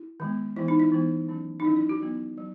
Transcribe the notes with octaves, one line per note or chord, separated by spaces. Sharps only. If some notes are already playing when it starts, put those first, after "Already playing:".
Already playing: E4
D#3 G#3 B3
E3 B3 E4
D#4
E4
E3 B3
D#3 F#3 C#4
D#4
D#3 F#3 C#4 E4
E4
F#4
F#3 B3
F#3